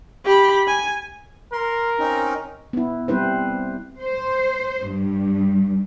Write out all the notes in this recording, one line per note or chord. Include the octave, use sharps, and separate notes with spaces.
G4 B5
G#5
A#4 C6
C4 C#4 D#4
B3 E4
G3 C4 E4 B4 C5
C5
G2